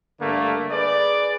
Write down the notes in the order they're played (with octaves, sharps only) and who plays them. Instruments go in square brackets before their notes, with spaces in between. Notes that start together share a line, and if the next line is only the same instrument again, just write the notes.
[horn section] G2 D3 A3 A#3
G#4 B4 D5